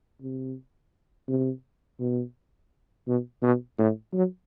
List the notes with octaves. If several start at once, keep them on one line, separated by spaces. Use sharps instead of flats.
C3
C3
B2
B2
B2
A2
F#3